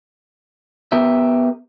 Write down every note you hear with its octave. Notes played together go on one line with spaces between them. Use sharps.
B3 G4 A#4 E5